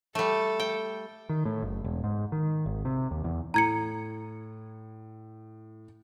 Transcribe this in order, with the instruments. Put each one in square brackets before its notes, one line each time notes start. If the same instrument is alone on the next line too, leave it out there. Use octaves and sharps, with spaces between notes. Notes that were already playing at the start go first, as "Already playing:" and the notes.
[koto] G3 A3 [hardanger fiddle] A4
[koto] G5
[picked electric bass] D#3
A2
F#1
E1
G#2
D#3
G#1
C3
D#2
E2
[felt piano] A2 [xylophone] A#5 G#6 C#7